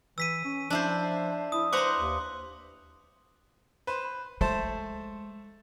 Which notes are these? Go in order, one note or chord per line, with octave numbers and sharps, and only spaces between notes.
E3 E6 B6 D#7
C#4
F3 D4 E4 C5
E4 D#6
B4 C5 F#5 A#5 C6 D6
D#2
B4 C5
G#3 A3 A4 C5